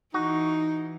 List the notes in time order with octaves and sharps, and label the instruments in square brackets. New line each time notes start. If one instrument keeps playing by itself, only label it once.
[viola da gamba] E3 [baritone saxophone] D#4 [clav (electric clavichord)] F#4